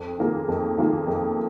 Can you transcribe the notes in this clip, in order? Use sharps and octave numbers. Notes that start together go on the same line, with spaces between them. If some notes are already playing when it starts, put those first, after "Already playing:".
Already playing: F2
D#3 A#3 F4 G#4
F2
D#3 A#3 F4 G#4
F2